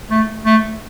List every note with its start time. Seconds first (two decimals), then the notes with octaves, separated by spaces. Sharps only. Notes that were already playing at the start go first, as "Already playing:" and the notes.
0.10 A3
0.45 A3